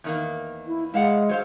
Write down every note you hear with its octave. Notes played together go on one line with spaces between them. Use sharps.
E2 D#3 A#3
E4
G#3 E4 F5 F#5
F#3 C5 F5